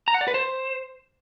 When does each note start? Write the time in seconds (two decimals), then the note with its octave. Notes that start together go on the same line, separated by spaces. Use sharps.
0.08 A#5
0.14 F#5
0.21 D5
0.28 B4
0.34 C5